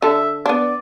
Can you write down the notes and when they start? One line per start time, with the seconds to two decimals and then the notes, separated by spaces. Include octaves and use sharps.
0.02 D3 A4 E5
0.46 B3 D4 D5